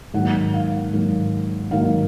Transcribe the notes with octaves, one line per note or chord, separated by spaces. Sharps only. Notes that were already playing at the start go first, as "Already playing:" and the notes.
G#2 D#3 F#3 A#3 F#5
F5
G#2 D#3 F#3 A#3
G#2 D#3 F#3 A#3 F5